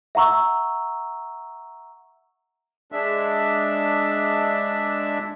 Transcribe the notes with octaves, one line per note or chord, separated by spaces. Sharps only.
E5 F#5 A#5 C#6 E6
G#3 D4 E5